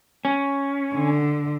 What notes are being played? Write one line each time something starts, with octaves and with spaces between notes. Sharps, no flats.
C#4
D3